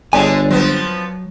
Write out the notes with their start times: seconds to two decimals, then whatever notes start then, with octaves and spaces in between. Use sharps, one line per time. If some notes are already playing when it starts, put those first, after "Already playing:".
0.13 G1 D3 G#3 C#5 D5 G#5
0.51 F3 F#3 B3 C4